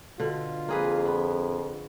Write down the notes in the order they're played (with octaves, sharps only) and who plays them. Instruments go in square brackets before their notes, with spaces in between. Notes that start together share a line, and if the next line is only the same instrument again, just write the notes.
[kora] B2 D3 [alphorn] F4
[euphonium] F2 [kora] A#3 G#4 B4
[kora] B3